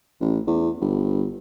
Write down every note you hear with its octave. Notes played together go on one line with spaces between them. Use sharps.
A1
E2
G1